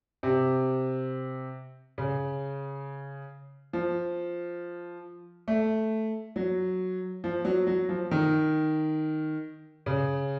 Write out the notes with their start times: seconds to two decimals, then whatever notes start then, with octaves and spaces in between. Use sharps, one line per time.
0.23 C3
1.98 C#3
3.73 F3
5.48 A3
6.36 F#3
7.24 F3
7.45 F#3
7.67 F#3
7.89 F3
8.11 D#3
9.86 C#3